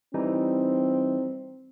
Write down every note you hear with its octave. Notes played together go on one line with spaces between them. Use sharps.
E3 G3 C4 D#4